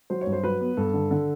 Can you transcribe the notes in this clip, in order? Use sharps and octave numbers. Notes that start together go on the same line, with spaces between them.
F#3 C5
C#5
G2
C5
F#3 B4
B3
G2 A4
D3
D3